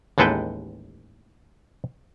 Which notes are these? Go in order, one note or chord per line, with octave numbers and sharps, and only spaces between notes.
A1 D#2 G#3 A4 B4 G5